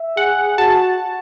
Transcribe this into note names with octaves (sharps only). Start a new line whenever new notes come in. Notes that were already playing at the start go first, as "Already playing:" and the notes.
Already playing: E5
G#4 F#5
F#4 A5